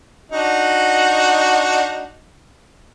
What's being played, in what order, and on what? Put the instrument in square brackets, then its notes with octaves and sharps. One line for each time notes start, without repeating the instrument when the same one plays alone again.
[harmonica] D4 D#4 F#4